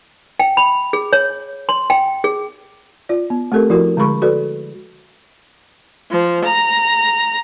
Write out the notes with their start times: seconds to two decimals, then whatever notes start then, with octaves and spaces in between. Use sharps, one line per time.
0.40 G5
0.57 B5
0.93 G#4
1.13 C#5
1.69 C6
1.90 G5
2.24 G#4
3.09 F4 D5
3.30 B3
3.52 A3 C4 G4 A4 A#4
3.70 F3 E4 F#4 A#4
3.97 D3 G#3 G#4 B5 C#6
4.22 F#4 A4 B4 D5
6.11 F3
6.44 A#5